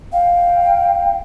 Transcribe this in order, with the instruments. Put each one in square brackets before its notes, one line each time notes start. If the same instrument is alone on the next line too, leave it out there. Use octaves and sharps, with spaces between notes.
[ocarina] F5 [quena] G5